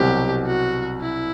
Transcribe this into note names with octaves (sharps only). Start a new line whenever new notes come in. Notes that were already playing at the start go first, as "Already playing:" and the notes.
Already playing: C2 B2 F#3 C4 G4
F#4
E4